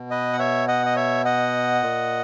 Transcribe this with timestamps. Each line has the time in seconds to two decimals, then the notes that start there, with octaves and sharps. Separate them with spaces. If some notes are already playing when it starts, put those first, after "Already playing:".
Already playing: B2
0.11 B4 D#5
0.33 F#5
0.39 C#5 E5
0.68 D#5 F#5
0.86 D#5
0.96 C#5 E5
1.25 D#5 F#5
1.83 A#2